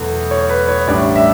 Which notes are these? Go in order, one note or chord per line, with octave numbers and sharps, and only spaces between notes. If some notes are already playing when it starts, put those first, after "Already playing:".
Already playing: E2 B2 F#3 A3
C#5
B4
C#5
A1 A2 G3 D4 D5
E5